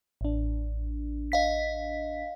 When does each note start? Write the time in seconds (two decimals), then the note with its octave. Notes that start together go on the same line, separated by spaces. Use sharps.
0.21 A1 D4
1.32 D#5 F5 B6